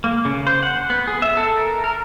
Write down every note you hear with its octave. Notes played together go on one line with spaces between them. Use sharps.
A#3
C#3
C5
F#5
B3
G#4
E5
A4
A#4
A#4